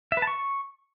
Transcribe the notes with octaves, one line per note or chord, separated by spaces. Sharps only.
E5
B4
A5
C#6